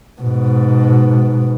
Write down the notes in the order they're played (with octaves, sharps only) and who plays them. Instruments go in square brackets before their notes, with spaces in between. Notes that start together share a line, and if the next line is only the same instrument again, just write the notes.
[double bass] G#2 B2